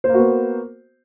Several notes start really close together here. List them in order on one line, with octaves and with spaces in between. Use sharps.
C5 A#3 F#4 B3